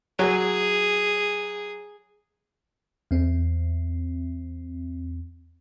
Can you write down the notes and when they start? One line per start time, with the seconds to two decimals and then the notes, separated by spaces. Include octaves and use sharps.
0.19 F#3 G#4
3.11 E2 C4